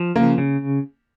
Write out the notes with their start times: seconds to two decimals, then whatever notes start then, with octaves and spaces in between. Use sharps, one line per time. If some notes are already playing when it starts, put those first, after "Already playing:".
Already playing: F3
0.16 C#3 A#3
0.38 C#3